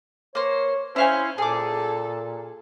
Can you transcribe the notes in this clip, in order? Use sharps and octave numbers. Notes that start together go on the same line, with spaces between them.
A#3 C5 C#5
C#4 E4 C5 F5 G#5
A#2 G#4 A4 D6